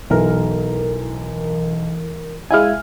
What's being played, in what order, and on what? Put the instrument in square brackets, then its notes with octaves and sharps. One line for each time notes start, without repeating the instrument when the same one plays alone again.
[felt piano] B1 [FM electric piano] E3 A#4
[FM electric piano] G#3 E4 G#5 [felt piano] E5 F5 F6